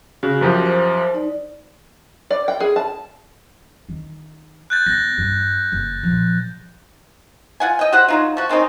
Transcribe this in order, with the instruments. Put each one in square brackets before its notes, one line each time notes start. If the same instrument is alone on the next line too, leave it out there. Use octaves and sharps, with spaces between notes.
[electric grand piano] C#3 [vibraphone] F#4
[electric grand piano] F#2 F3 G4
[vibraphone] C5
D#4 D5
[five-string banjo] D5
G5
G#4
A5
[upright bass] D#3
[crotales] F#6 G6 A6
[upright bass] B3 [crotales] A#6
[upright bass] G2
F#1
A#2 F3
[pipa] F4 F#5 G#5
D#5 G5
F#4 G4 C5 F#5
F#3 D#4 F4
F3 F#4
D#3 C4 C#4 D#4